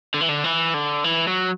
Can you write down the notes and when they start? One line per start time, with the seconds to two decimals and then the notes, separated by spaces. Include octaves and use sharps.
0.14 D3
0.21 E3
0.29 D3
0.44 E3
0.74 D3
1.04 E3
1.28 F#3